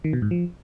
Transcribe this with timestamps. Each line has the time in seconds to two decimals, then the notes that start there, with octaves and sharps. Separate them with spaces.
0.04 D#3
0.13 B2
0.22 G#2
0.31 F3